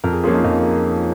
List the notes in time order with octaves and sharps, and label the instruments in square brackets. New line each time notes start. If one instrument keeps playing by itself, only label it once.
[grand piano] F2 [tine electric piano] A#4
[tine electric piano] G#4
[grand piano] F3 A#3 C#4 G#4 [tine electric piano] F4
[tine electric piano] D#4
[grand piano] F2 [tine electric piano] D#4